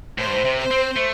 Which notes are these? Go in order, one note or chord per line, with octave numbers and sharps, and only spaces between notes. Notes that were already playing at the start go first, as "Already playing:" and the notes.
A2 C5
G2
A2
C3
C5
C4
A3